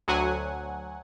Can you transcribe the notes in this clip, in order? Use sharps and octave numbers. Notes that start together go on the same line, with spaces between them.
D2 F#3 F#5 G#5